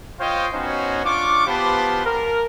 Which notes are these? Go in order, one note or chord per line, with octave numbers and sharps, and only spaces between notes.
F4 C5 C#5 D#5 F5 G5
B3 C#4 D#4 F#4 C5 C#5
D4 F4 C#6 D6
B3 F4 G4 B4 C5 A5
A#4